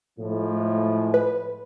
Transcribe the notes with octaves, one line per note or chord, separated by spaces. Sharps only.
A2 F3 G#3
B4